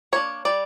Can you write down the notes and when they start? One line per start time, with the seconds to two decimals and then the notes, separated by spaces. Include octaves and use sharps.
0.12 A#3 D4 C#5
0.45 G3 D5